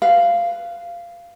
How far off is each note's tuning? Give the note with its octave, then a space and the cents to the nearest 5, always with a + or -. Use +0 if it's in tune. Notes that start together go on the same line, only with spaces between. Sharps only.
B4 +0 F5 -15